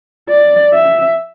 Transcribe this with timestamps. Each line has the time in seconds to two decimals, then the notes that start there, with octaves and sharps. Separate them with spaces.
0.29 D5
0.74 E5